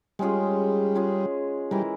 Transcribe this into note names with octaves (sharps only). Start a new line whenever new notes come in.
G3 G#3 C#4 F4 G#4
G#3 C#4 F4 G#4
E3 G3 G#3 E4 A#4